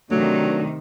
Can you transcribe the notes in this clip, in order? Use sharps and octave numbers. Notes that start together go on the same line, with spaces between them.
C3 D#3 F#3 A3 D4